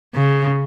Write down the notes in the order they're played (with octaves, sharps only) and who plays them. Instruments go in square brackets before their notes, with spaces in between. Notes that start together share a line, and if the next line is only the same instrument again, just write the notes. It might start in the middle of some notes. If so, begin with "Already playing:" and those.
[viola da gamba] C#3